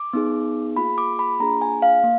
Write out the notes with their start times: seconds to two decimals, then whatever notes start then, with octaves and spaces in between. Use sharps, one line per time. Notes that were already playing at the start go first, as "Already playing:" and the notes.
Already playing: D6
0.13 B3 D#4 G#4
0.77 A#3 F4 G#4 B5
0.98 D6
1.19 B5
1.40 A#3 D4 F4 G#4 A#5
1.62 G#5
1.82 F5
2.04 A#3